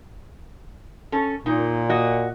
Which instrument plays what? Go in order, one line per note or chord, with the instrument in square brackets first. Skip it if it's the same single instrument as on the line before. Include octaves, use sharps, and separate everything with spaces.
[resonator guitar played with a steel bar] C#4 A4
[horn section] A#2 [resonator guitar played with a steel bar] D#4
[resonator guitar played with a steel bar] F#4 D#5